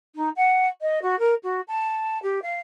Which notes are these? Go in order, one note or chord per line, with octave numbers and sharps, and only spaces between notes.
D#4
F#5
D#5
F#4
A#4
F#4
A5
G4
F5